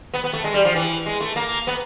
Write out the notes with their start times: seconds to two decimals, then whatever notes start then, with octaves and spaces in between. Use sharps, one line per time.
0.14 B3
0.24 B3
0.33 A3
0.44 G#3
0.54 G3
0.65 F3
0.75 E3
1.06 G#3
1.20 A3
1.36 A#3
1.67 B3